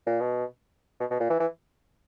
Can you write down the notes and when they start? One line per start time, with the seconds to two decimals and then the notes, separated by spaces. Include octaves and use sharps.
0.06 A#2
0.20 B2
1.00 B2
1.11 B2
1.20 A#2
1.30 E3
1.40 E3